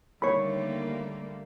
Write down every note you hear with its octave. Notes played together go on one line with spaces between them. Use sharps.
D#2 D3 G3 A3 A#3 C#5 B5